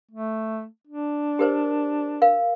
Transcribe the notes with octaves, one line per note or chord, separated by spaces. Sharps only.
A3
D4
G4 A#4 C5
A#4 F5